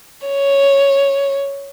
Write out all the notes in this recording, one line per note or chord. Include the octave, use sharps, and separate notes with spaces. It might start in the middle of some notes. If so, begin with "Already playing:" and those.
C#5